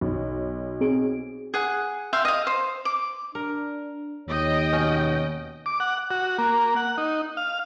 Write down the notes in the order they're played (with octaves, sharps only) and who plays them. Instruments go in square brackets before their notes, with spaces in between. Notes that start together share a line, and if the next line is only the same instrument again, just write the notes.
[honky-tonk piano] B1
[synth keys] C4 G#4 D7
[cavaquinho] G#4 F#5
E5 F5 G5 C6
D#5 F5
C5
D6
[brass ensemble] D4 [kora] A#4
[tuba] D#2 [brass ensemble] C#5 [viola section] D#5 G5
[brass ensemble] B2 [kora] C#4
[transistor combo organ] D6
F#5
F#4
A#3
F#5
D#4
F5